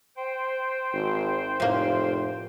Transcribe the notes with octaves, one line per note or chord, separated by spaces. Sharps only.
C5 G5
G#1
F1 A2 A#3